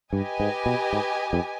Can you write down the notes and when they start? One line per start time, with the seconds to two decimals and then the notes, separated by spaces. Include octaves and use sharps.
0.12 G2 G4 B4 D#5 G#5
0.40 G#2
0.66 B2
0.93 G#2
1.33 F2